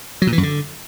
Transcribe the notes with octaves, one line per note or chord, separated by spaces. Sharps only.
F#3
A#2
E3
F#2
D3